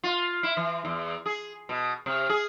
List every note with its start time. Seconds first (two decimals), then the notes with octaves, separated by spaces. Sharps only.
0.03 F4
0.43 E4
0.57 E3
0.85 E2
1.26 G#4
1.69 B2
2.06 C3
2.29 G#4